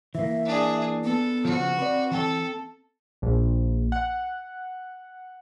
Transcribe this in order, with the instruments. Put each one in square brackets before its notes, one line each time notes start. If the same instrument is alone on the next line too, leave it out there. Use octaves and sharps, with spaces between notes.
[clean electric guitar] E3 A#3 [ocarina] E5
[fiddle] D4 G#4
[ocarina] B3 [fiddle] A4
[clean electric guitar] C#3 F3 [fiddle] F#4
[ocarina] C4 [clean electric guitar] B4 D5
[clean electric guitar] E3 G5 [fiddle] A4
[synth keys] A#1
F#5